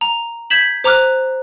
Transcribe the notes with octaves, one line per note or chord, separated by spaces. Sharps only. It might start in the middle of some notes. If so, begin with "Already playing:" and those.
A#5
G6 G#6 B6 E7 F#7
C5 A#5 D6 F6 F#6